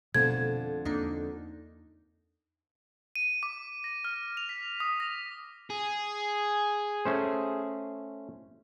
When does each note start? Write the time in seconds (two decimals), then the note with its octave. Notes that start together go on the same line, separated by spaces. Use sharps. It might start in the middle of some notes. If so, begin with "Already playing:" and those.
0.15 F2 B2 D3 A3 B3 G#6
0.85 E2 A#3 D4 D#4
3.15 D#7
3.43 D6
3.84 A#6
4.05 F6
4.37 F7
4.49 B6
4.80 D#6
5.00 A#6
5.70 G#4
7.05 A3 C#4 C5